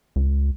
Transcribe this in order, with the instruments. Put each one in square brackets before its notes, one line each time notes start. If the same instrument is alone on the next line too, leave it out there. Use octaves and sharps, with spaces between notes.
[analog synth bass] C#2